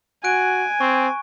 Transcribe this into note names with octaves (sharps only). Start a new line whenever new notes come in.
F#4 G#5 F#6 D7
C4 C#6